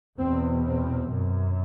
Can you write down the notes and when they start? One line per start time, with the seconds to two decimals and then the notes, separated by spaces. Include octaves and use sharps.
0.19 E2 B2 C4
0.65 C4
1.10 F#2